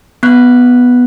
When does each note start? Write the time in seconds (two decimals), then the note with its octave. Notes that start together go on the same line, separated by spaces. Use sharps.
0.23 B3 F#6